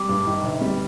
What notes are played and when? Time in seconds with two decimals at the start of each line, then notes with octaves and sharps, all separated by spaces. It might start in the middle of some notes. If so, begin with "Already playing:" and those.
Already playing: G3 D6
0.09 G2
0.26 D#3
0.44 G1
0.61 G3